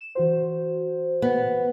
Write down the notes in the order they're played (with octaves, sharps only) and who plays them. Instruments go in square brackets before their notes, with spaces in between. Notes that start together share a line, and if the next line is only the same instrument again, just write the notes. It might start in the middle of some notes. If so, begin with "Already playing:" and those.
[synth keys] E7
E3 F#4 C5
[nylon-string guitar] B3